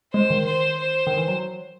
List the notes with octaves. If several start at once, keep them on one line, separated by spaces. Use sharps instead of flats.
G#3 C5
D#3
C5
C5
D#3
E3
F#3